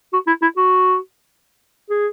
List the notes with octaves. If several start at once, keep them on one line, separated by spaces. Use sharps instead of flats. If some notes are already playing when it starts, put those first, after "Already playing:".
F#4
E4
E4
F#4
G#4